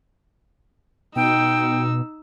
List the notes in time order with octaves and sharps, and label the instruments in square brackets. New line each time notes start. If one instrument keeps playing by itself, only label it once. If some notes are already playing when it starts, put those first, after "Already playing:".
[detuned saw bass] B2 [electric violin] D#4 E6 [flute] G5